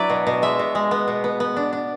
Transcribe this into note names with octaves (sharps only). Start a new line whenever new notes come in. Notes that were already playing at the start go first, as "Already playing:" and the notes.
Already playing: F#3 D4 E4 B4 D5
B2
B2
G#3 E5
B2
G#3
B3
B2
B3
B3
D4
D4